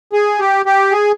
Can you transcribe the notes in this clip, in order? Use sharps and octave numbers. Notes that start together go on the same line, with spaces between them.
G#4
G4
G4
G#4